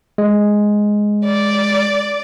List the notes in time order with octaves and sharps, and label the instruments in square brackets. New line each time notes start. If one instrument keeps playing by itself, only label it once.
[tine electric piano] G#3
[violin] D5